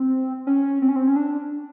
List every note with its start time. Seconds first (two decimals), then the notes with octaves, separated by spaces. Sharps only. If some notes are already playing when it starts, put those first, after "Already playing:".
Already playing: C4
0.47 C#4
0.82 C4
0.89 C#4
0.96 C4
1.07 C#4
1.16 D4